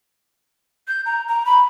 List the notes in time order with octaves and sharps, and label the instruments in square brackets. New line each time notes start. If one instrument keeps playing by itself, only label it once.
[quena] G6
A#5
A#5
B5